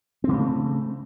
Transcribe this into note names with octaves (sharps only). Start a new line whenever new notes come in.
C#3 A3 C4